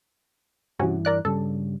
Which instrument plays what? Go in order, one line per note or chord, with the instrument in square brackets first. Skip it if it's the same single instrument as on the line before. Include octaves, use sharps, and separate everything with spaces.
[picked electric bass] G2 E3 [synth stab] C3 C#4 F#4
[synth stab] A#4 D5 F#6
[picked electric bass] G2 C#3 G3 [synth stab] A4